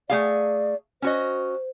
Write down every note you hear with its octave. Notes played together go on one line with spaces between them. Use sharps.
A3 G#4 D5 F5
C#4 F#4 C5 D#5